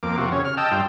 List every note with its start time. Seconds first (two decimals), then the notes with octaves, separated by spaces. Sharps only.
0.03 F2 A#3 D6
0.18 C3 F4 F#4
0.32 C#3 C#5
0.45 F6
0.57 D#5 G5 A5 E6
0.71 G2 F4 G5